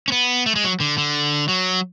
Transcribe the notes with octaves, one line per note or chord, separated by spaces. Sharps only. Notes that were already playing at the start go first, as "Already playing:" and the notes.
C#4
B3
A3
G#3
F#3
D3
D3
F#3